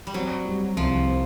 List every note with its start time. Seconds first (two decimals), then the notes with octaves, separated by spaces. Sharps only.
0.07 G3
0.14 F#3 C4
0.45 G3
0.77 C2 F3
1.08 C4